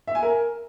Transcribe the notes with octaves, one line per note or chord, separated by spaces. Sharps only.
E5
G#5
A#4